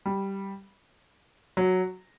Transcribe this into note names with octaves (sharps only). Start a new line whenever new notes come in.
G3
F#3